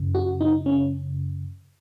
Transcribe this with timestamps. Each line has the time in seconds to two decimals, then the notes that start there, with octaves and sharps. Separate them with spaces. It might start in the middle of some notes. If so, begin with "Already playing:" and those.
Already playing: F#2 C#3
0.15 F#4
0.41 D#4
0.66 C#4